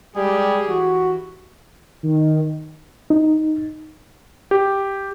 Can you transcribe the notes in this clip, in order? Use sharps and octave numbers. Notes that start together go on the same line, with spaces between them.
G3 G#3 G4 G#4
E3 F#4
D#3
D#4
G4